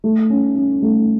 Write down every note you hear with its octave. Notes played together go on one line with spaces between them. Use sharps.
A3
C#4
C#4
A3